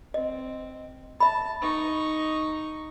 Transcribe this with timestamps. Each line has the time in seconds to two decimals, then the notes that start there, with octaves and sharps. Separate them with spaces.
0.14 C4 D#5
1.20 E5 A5 B5
1.62 D#4 C#6